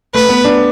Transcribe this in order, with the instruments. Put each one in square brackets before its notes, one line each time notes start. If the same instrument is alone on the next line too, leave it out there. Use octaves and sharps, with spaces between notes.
[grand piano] A3 [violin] B4
[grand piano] B3
D4